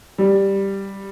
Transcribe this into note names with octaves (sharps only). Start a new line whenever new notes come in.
G3